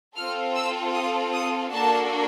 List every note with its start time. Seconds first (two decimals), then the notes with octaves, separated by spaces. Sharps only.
0.16 C4 F4 A4 F6
0.55 E6
0.93 D#6
1.33 D#6
1.72 A#3 D4 F#4 A4 A5